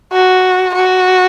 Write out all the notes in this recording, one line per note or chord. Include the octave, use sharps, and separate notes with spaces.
F#4
F#4